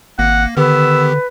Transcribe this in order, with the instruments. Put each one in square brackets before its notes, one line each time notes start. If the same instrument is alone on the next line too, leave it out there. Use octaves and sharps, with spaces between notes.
[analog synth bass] G#1 [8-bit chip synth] A#3 A#6 [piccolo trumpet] F#5
[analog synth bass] D3 [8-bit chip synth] D#3 B3 G4 [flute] B4 [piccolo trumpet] E6